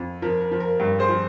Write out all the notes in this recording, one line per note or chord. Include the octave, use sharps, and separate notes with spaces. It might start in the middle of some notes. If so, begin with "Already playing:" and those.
Already playing: F2
F3 A#4
A#4
F3
A#4
G2 A#4
G#4 C5
F3